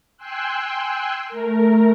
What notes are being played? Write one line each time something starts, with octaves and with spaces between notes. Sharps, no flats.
G5 G#5 C6 E6 F#6
A3 A#4